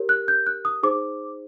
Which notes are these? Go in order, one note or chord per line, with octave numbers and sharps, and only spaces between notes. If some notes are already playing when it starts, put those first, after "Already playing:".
Already playing: G4 A#4 C#5
F#6
G6
F#6
D#6
D#4 G#4 C5 D6